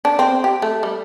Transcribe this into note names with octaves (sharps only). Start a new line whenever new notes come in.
D4
C4
G4
A3
G3